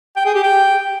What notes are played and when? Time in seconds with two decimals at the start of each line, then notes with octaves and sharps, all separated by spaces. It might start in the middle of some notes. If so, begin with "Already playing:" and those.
0.16 G5
0.25 G#4
0.34 G4
0.43 G5